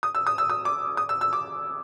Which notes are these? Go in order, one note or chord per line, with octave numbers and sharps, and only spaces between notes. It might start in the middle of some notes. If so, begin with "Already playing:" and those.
D#6
E6
D#6
E6
D#6
D6
D#6
E6
E6
D6